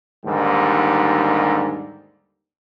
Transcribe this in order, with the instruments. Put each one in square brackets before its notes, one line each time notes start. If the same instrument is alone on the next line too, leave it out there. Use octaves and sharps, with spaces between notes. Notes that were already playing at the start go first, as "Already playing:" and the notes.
[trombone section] D#2 G#2 D3 G3